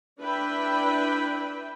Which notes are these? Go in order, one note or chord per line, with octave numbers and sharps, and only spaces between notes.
D4 E4 B4 E5 G5 B5